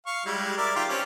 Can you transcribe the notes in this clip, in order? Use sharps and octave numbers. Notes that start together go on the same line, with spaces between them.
F5 C#6
G3 G#3 E4
A#4 D5 E5
D#3 F4 G4
C4 C#4 G4